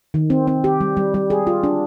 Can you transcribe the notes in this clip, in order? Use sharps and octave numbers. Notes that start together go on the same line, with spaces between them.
D#3
C4
C4
G4
G3
G3
G3
G#4
F4
D4